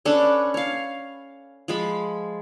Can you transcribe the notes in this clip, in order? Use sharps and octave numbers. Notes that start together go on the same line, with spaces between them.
C#4 D4 A4 B4
C#5 F5
F3 G#3 B5